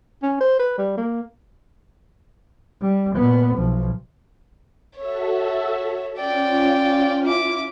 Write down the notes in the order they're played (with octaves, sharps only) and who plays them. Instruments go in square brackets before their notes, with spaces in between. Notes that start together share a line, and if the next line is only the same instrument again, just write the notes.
[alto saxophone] C#4
C5
B4
G3
A#3
[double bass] G3
A#2 B3
B1 F3
[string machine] F#4 A4 E5 [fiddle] C#5
[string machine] C#4 F4 [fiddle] D5 G5
[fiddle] E4 D6